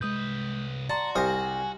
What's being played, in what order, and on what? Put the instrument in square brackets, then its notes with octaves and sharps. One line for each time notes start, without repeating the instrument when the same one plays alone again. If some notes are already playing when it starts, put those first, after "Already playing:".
[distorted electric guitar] C2 B4 [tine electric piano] G#3 D#6 G6
[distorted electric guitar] F#4 [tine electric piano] D5 C6 [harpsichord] A5 [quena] A#5
[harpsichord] C2 C5 D#6 [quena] G#5 [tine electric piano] F6 A#6